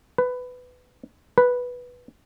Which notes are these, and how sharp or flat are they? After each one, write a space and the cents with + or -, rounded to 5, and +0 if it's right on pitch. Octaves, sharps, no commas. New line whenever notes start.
B4 +15
B4 -5